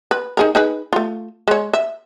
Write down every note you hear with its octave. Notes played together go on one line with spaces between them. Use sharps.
B4
D#4 G#4 A#4
D#4 G#4 B4
A3 F4
G#3 C#5
E5